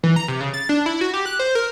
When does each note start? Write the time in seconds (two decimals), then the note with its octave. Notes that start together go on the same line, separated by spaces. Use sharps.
0.03 E3
0.16 A#5
0.28 C3
0.40 C#3
0.54 A6
0.69 D4
0.86 E4
1.01 F#4
1.14 G4
1.26 F#6
1.39 C5
1.55 A#4